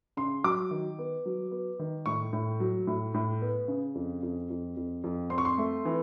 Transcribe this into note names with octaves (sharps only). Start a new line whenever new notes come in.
C#3 C6
F#3 D6
D#3
B3
F#3
B3
D#3
A2 C#6
A2
F#3
A2
A2
B3
C#3
F2
F2
F2
F2
F2
C4 C6
C#6
C6
A3
E3